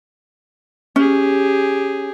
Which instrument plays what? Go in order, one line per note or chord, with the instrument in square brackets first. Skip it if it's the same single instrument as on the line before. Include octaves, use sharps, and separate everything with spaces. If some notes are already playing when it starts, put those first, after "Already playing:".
[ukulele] C#4 [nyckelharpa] G4 G#4